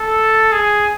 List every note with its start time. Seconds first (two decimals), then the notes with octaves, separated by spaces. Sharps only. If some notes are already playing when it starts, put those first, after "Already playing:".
Already playing: A4
0.52 G#4